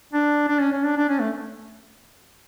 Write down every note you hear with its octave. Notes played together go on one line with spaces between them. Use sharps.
D4
D4
C#4
C#4
D4
D4
C#4
A3